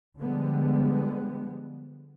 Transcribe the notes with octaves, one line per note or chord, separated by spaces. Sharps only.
D3 F3 G3 G#3 B3